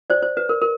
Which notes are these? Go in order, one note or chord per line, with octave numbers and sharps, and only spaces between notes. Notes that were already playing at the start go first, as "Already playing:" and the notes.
C5 D5
C5
B4
A#4
A#4